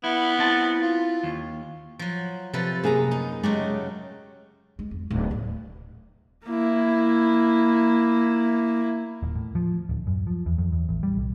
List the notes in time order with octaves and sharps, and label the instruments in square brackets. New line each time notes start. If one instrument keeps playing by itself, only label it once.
[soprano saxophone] B3 [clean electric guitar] E4
[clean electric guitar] C4 E4 A5
[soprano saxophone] F4
[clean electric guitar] D#2
[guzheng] F3 F#3
[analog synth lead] C3 [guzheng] F3 A4 B4
[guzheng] F#2 B4 A#5 [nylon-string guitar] A#3 G#4
[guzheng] D#4
[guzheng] C#3 F#3 A3 [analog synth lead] G#3 [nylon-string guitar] G4
[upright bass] G#3
F2
D1
C#3
[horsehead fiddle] A#3 E4
[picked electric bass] D#1
A2
F3
D1
F#2
F3
E2
F2
E2
A1
G3
B1